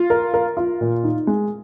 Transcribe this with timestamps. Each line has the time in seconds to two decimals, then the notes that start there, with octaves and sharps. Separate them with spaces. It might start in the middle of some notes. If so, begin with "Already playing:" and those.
Already playing: F4
0.10 A#4
0.34 A#4
0.57 F4
0.81 A#2
1.04 D#4
1.27 G#3